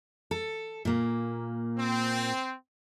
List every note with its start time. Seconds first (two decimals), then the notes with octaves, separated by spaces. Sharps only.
0.31 A4
0.85 A#2 A#3
1.78 C4